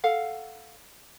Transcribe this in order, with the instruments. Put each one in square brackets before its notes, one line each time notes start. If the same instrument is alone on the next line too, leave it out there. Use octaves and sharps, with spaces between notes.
[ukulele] A4 F5 F#5